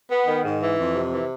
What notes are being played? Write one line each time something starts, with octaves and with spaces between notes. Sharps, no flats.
B3
D#3
G#2
E3
F2
C3
E3